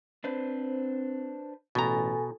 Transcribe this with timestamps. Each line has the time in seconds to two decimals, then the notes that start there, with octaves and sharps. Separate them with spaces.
0.24 C4 D4 B4 C5
1.75 A1 B2 A4 G#5 A#5